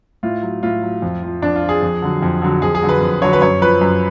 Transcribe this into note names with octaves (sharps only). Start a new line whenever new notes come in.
A2 F4
F#3
A2 F4
F#3
F2
F3
F2 D4
F4
F3
G#4
F2
D3 F#3
F2
D3 F#3
F2 G#4
G#4
D3 F#3
B4
F2
D3 F#3 C#5
B4
F#2 C#5
F3 B4
F#2